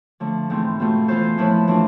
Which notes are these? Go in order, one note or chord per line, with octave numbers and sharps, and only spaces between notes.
D3 F3 A3
G#2 E3 A3 C4
B2 A3 C4 F4
E3 B3 F4 A4 C5
A2 F3 A3 E4 B4
E3 A3 D4 F4